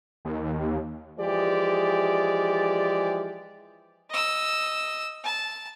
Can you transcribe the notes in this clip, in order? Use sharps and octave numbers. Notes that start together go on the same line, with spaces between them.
D#2
E3 F3 G#3 G4 G#4 D5
D#5 E6
A5